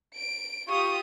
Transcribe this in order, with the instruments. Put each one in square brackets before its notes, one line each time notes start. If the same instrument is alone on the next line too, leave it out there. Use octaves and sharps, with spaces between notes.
[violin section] D7
[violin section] F4 G4 D#6 [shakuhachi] C#6